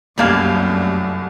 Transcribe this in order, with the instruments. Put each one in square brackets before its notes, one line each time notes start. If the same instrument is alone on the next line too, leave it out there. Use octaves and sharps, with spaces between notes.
[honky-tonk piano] F1 C2 G#6 [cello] F#2 A3 [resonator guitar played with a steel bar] G3 A#3 F5